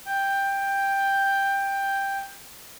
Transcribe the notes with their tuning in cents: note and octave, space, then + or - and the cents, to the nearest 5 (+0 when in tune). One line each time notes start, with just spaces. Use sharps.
G5 +10